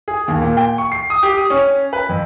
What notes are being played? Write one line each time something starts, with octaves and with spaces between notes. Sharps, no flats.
G#4
D#2
A#2
G5
C#6
C7
D#6
G4
D#6
C#4
B4
F2